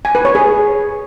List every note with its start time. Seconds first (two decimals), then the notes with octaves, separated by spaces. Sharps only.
0.05 G#5
0.15 B4
0.25 C#5
0.35 G#4